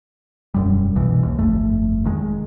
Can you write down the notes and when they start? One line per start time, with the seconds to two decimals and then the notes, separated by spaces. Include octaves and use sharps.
0.54 E1 F#2 G3
0.95 C2 B2 E3
1.23 D#2
1.39 G1 F2 A3
2.04 F1 D#3 G#3